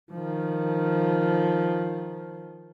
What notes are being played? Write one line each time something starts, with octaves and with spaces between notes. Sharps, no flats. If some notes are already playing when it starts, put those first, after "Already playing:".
D#3 F3